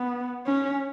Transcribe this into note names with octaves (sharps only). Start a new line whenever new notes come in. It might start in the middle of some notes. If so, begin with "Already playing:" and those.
Already playing: B3
C#4